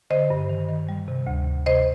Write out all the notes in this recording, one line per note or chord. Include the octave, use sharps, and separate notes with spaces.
D3 C5 D#5
G2
D#3
D#3
G3
C3
D2
D2
C3 C5 D#5